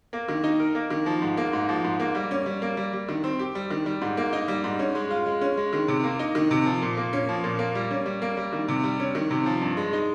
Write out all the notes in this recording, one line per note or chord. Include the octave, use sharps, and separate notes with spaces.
A#3
D#3
D#4
A#4
A#3
D#3
F3
G#2
A#3
G#2
F3
G#2
A#3
G3
C#4
G3
A#3
G3
G3
D#3
C4
G4
G3
D#3
G3
G#2
A#3
D#4
G3
G#2
C#4
G#3
F4
G#3
C#4
G#3
D#3
C3
A#3
D#4
D#3
C3
F3
A#2
A#3
C#4
F3
A#2
A#3
G3
C#4
G3
A#3
G3
D#3
C3
G3
C#4
D#3
C3
F3
G2
G#3
D#4